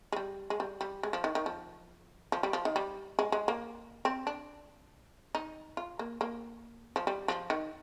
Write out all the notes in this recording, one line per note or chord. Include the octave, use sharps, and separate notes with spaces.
G#3
G3
G#3
G3
G3
G#3
F3
D#3
D#3
F3
F3
G3
F3
D#3
G3
G#3
G#3
A#3
C4
D4
D#4
F4
A#3
A#3
F3
G3
F3
D#3